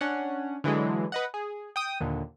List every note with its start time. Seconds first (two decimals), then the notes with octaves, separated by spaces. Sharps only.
0.01 C#4 D4 F#5
0.64 D3 E3 F#3 G#3
1.12 B4 D#5 F#5
1.34 G#4
1.76 G5 D#6
2.00 D#2 A#2 D3